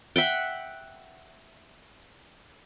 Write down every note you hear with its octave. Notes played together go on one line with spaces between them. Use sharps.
E5 F#5 G5